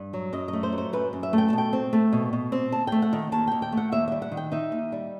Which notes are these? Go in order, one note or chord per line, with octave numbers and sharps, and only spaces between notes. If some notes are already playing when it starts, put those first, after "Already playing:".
Already playing: G2
F#3
F#2 D#5
D#5
A3
C5
F#3
C5
F#2 B4
F#2
E5
A3
G5
A5
B2 G5
C4
A3
B2
B2
C4
D#2 A5
A3 G5
F#5
D#3
D#2 A5
D#2 G5
G5
A3 F#5
D#2 E5
G3 E5
F#5
D#3
G5
D#4 E5
D#2
G3